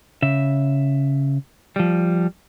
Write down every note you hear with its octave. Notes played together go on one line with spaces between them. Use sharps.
C#3 E5
F3 G3